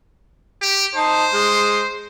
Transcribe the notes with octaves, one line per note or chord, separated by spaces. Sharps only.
G4
D#4 C5 A5
G#3